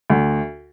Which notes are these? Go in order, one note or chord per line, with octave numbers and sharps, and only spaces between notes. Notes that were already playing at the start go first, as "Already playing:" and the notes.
D2